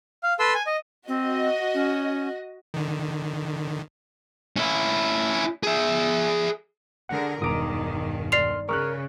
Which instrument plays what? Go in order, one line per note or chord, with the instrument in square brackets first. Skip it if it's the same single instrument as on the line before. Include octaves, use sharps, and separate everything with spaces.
[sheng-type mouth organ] F5
A4 B4 C6 E6
G#5
D#5
[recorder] C4 [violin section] F#4 D#5
[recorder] C#4
[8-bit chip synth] D3 D#3
[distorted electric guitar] C#4 E4
G#4 E5
[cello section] D3 G#4 A#4 [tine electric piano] F#5
[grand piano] E1 D7 [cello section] G2 D#3 [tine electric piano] A#5 D6 D#6
[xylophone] D5 C7 F7 [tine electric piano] C6 F6
[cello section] C#3 [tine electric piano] A#4 [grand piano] C#6 F6 F#6